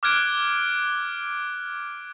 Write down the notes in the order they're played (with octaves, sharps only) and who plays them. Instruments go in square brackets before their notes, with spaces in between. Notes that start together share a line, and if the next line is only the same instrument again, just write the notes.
[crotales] D6 F6 F#6 G#6 D7